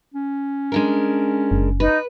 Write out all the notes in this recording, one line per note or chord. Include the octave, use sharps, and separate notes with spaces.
C#4
G#3 D4 A#4
F#1
D#4 B4